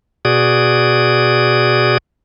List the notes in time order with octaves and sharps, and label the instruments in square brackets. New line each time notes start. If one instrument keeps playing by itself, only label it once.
[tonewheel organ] B2 F#4 G#4 D5 D#6